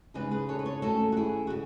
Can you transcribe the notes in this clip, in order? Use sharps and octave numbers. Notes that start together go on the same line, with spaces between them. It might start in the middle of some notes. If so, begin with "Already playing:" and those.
C#3 G#3 D#4 G#4 B4
G#4 B4
A4 C#5
B4
A4 C#5
D#3 A3 C#4 F#4 A4
F#4
E4 G#4
F#4
C#3